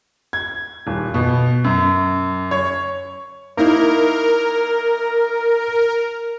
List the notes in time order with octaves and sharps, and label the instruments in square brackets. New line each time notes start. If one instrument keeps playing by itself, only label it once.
[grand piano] G#6
D#1
B2
F#2
C#5
[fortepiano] A#3 D#4 E4 [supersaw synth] A#4